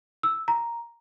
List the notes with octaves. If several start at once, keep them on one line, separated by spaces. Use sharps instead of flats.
E6
A#5